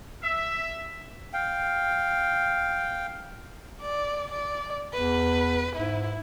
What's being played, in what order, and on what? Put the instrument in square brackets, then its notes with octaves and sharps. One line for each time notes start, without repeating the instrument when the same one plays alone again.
[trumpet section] E5
[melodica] F5 G5
[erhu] D5
D5
[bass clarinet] E2 [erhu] B4
[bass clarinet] G#2 [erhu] E4